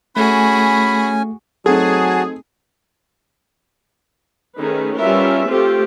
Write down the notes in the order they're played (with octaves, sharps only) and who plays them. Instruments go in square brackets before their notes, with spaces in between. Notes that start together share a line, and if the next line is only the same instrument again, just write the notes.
[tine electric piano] A3 [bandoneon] C#4 G#5 [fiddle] F#4 G#4 [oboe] B5
[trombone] F#3 [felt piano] A3 C4 D#4 [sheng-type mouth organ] F#4 A5 [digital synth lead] G#4
[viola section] D#3 A3 C#4 G#4 B4
G3 C#4 F4 A#4 B4 E5
A3 C4 F4 G4